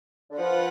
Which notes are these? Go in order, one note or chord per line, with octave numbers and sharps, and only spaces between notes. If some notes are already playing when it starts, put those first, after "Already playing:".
D3
F3 F4 B4 F#5